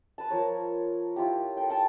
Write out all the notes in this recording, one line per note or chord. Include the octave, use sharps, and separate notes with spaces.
B4 A5
F3 A#4 C#5
E4 F4 G4
A4 G5
G5 A5